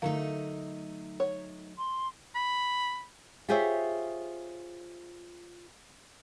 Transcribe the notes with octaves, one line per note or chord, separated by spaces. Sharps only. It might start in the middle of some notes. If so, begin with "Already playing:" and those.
D3 F#3 A3 D#4 F5
C#5
C6
B5
F4 G4 G#4 C5 C#5 E5